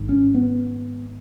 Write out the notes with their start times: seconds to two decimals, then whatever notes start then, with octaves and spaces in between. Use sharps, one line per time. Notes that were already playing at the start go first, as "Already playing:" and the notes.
Already playing: G#1 G#2
0.09 C#4
0.34 B3